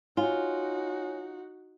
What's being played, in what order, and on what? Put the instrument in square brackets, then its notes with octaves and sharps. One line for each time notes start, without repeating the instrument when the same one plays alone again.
[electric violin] D#4 F#4 [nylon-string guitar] F4 [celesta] C#5 G#5